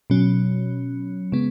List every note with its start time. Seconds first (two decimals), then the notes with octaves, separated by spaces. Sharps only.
0.10 B2 F#3 C#4
1.32 C#3 G#3 B3